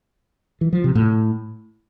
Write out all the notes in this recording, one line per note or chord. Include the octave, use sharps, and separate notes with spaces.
E3
F3
C3
A2